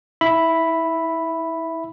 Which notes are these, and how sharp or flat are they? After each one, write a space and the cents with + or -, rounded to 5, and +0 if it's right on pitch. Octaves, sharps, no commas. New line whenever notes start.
E4 -30 E5 +0 B5 +0